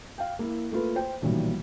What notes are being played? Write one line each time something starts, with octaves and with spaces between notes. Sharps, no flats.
F5 G5
A#3 E4
A3 A#3 F4 B4
C5 G5
B1 A#2 D#3 E3 G3